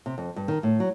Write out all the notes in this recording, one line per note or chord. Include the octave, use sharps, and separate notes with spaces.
C3
F2
G2
D#3
A2
F#3